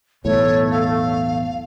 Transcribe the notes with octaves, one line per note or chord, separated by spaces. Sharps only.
B1 E2 A2 A3 C#5
F5